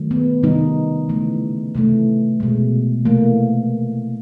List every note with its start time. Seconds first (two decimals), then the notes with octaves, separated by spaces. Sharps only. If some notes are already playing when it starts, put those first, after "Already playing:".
Already playing: D#3 F#3 A3
0.11 B3
0.43 C3 D#3 G3 D#4
1.09 C#3 E3 A3
1.75 C3 E3 A3
2.40 B2 G#3
3.05 C3 E3 A3 A#3